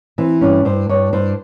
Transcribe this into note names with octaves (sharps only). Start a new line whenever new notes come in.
E3 C4
G2 C#4
G2 C5
G2 C#5
G2 C5